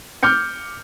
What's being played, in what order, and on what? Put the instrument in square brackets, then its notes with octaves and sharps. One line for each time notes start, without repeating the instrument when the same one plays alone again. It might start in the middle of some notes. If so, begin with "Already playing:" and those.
[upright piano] D6 F6 G6 C#7